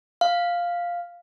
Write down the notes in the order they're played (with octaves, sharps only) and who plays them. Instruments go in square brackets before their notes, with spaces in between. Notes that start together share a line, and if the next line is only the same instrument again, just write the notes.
[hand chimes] F5